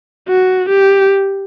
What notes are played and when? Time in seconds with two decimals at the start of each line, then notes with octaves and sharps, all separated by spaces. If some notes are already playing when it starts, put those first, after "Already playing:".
0.28 F#4
0.69 G4